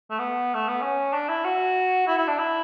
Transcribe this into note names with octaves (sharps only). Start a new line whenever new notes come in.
A3
B3
A3
B3
C#4
D4
E4
F#4
E4
E4
D4
E4